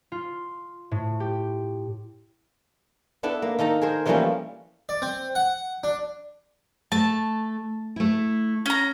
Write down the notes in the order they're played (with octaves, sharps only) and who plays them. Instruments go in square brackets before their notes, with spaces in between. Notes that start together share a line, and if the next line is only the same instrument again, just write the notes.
[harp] F4
A2
G4
[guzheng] B3 D4 E4 A4 B4
A#3
D#3 D#4 A4 A#5
G#4 A#4 C5
E3 F3 G3 A3 A#3 C#4
[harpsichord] D5
C4
F#5
D4
[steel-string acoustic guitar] A3 [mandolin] A5
[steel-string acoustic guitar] A3 E4
[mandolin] C#4 A#5